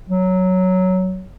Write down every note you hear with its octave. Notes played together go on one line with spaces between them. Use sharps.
F#3